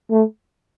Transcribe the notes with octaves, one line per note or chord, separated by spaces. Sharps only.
A3